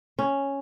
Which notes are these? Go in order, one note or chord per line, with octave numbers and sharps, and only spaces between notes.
C#4